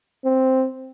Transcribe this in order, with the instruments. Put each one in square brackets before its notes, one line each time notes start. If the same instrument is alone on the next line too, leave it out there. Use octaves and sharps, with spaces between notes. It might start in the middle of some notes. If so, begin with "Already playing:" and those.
[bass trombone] C4